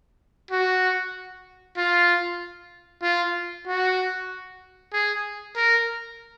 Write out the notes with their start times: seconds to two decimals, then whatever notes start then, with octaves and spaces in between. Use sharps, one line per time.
0.51 F#4
1.77 F4
3.03 F4
3.67 F#4
4.93 G#4
5.56 A#4